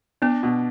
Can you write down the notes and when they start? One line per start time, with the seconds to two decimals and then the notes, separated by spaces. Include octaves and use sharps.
0.22 B3 D4
0.43 B2